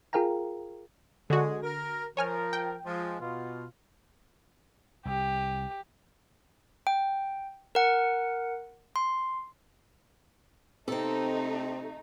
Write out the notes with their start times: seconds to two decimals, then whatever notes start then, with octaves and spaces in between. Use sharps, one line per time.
0.13 F4 G#4 A#4 F5 G5 A#5
1.30 D3 G#3 F#4 G#5
1.63 A#4
2.17 F3 A#4 C#5 G#5 F6
2.53 G5
2.86 F3 G#3
3.20 B2 F4
5.05 C2 G4
6.87 G5
7.75 A#4 F#5
8.96 C6
10.88 C3 A3 C4 D#4 A4